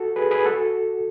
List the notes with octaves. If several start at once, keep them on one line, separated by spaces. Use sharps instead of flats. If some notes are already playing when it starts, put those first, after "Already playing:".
Already playing: F#4 A4
G#4 B4
G#4 B4
F#4 A4